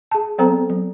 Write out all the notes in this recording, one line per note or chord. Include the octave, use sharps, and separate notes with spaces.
G#4 A5
F#3 B3 C4 A4 C5 A#5
F#3